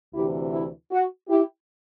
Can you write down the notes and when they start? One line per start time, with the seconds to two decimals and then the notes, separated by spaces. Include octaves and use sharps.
0.13 D2 C3 E3 E4 G4
0.52 E4
0.90 F#4
1.29 E4 G4